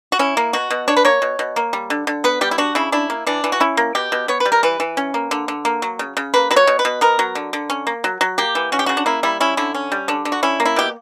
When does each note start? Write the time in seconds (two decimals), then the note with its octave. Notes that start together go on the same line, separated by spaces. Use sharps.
0.12 F#4
0.19 C#4 E4
0.37 A#3
0.53 B2 F#4
0.71 B2
0.88 D4 C#5
0.97 B4
1.05 A#3 C#5
1.22 B2
1.39 B2
1.56 A#3
1.73 G3
1.90 D3
2.07 D3
2.24 B3 B4
2.41 G3 G4
2.51 E4
2.58 D4 F#4
2.75 C#3 E4
2.92 D4 E4
3.10 A#3
3.27 E3 D4
3.44 E3
3.52 F#4
3.60 C#4 E4
3.77 A#3
3.95 B2 G4
4.12 B2
4.28 B3 C#5
4.40 B4
4.45 G3
4.52 A#4
4.63 E3 B4
4.80 E3
4.97 C#4
5.14 A#3
5.31 D3
5.48 D3
5.65 A#3
5.82 F#3
5.99 C#3
6.17 C#3
6.34 A#3 B4
6.51 F#3 B4
6.56 C#5
6.67 B2
6.79 B4
6.85 B2
7.01 B3 A#4
7.19 F#3
7.35 D3
7.53 D3
7.70 C#4
7.87 A#3
8.04 F#3
8.21 F#3
8.38 A#3 G4
8.55 E3
8.72 C#4 F#4
8.79 G4
8.86 C#3 F#4
8.97 D4
9.06 A#3 E4
9.23 G3 E4
9.40 C#4 E4
9.57 D3 E4
9.74 C#4
9.92 G3
10.08 D3 D4
10.25 D3
10.32 F#4
10.43 C#4 E4
10.60 A#3
10.65 E4
10.76 B2 G4